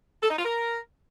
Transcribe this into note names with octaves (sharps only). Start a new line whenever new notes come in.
A4
D#4
F4
A#4